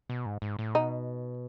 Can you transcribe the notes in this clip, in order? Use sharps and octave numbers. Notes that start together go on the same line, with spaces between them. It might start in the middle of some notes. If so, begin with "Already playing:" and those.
B2
G#2
G#2
A2
B2 D#4